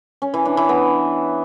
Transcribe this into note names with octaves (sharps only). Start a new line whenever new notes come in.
C#4
E3
D4
E3
B3